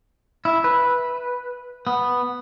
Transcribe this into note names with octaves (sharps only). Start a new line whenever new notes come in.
E4
B4
B3